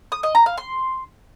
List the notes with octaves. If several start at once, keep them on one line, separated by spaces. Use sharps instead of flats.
D#6
D#5
A#5
F5
C6